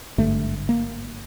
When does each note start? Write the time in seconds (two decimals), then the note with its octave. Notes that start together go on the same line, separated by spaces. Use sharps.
0.18 G#1 G2 D3 A3
0.69 A#3